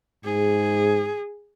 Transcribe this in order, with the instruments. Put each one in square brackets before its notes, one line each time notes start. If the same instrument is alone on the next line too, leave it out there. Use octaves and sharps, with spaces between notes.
[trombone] G#2 [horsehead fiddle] G#4